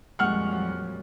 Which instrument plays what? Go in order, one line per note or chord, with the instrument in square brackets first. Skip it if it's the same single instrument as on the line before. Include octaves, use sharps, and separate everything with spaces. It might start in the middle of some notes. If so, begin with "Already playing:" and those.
[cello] F2 G3 [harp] A#2 G#3 C#6 [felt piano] F#5 F6
[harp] F#3